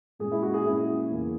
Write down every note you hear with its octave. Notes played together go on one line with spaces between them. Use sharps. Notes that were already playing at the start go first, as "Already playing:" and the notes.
A#2 G#3 C#4 G#4
E4
F#4
G#4
A#2 G#3 C#4 E4
E2 C#3 E3 A#3